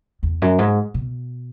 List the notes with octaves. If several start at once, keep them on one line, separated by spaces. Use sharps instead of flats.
E2
F#2
G#2
B2